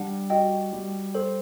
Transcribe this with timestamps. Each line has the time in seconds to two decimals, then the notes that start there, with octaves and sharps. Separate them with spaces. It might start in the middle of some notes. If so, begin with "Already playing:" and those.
Already playing: G3 D4 F#5 A5
0.30 F#4 D#5 G5
0.72 G3
1.15 A4 C5